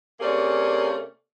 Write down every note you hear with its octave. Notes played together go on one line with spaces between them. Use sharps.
C3 A3 A#3 C#4 G#4 D5